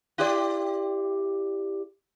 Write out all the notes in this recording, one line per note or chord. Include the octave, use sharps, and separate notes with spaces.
E4 G4 D5